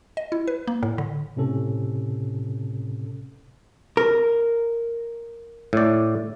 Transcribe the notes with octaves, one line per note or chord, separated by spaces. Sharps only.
D#5
E4
B4
A#3
A2
D3
A2 C3 C#4 A4
A#4
A2 D5